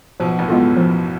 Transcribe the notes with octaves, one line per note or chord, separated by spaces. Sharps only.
B1 B2 F3
A1 A2
G#3 B3 F4 A4
F#2
F#2 F3